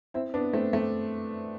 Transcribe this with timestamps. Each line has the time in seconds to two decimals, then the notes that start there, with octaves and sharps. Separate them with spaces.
0.14 C4 E4
0.34 B3 D4
0.53 A3 C4
0.73 A3 C4